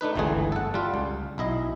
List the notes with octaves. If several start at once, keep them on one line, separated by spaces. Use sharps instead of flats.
A3 D4 D#4 B4
G1 C#2 E3 A3 G#4
A4 F#5
G3 F4
C#2
B1 E4 D#5